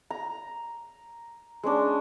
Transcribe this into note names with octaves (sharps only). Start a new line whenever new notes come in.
A#5
G#3 C#4 D4